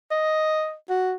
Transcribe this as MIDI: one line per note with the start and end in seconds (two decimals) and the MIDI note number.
0.11 0.74 75
0.89 1.14 66